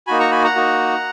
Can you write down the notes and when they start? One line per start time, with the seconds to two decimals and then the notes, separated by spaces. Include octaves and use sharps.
0.07 A#3 D#4 F#4 G#5 B5
0.20 A#5 C#6
0.31 G#5 B5
0.44 F#5 A#5
0.56 A#3 D#4 F#4